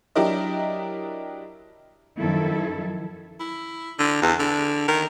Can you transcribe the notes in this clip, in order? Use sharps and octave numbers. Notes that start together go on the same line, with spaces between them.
F#3 D4 E4 G4 A#4 D#5
F#2 D#3 F3 E4 A4
E4
D3
E2
D3
D#3